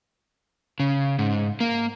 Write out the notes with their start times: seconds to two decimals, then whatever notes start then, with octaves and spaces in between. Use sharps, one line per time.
0.80 C#3
1.19 G#2
1.61 A#3